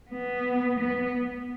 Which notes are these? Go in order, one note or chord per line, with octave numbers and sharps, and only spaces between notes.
B3
B3